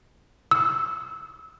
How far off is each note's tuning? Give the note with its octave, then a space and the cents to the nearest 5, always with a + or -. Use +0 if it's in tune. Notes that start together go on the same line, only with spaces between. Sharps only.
E6 -20